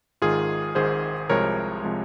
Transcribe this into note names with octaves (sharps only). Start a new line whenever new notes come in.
G#1 G#2 D#3 F4 G#4
G#1 G#2 D#3 G#4 C5
C2 C3 F3 G#3 A#4 C#5
C3 F3 G#3